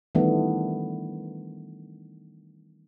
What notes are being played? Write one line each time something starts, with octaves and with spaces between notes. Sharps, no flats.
D#3 E3 G3 A3 B3 D4